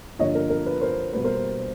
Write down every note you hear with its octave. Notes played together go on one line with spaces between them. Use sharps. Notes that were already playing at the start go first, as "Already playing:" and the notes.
G2 D3 F3 A#3 C#5 D#5
A#4
A#4
B4
A#4 C5
B2 G3 A#3 B4
A#4 C5
C5